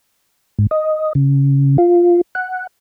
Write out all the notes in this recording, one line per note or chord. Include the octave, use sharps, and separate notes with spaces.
G#2
D#5
C#3
F4
F#5